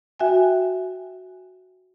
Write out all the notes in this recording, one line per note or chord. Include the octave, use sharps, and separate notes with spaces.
F#4 E5 G5 G#5